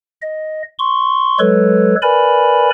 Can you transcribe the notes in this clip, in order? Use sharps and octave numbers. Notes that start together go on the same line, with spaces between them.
D#5
C6 C#6
F#3 G#3 A4 B4 C#5
A#4 B4 D5 G#5 B5